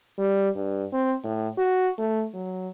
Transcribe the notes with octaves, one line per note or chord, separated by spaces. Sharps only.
G3
G2
C4
A2
F#4
A3
F#3